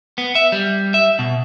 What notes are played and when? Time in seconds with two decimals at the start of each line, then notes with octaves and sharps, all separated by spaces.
0.18 B3
0.35 E5
0.52 G3
0.94 E5
1.19 B2